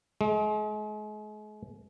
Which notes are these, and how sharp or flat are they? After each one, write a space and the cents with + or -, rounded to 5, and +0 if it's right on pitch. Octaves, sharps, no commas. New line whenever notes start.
G#3 +35